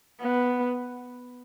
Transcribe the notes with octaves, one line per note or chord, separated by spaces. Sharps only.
B3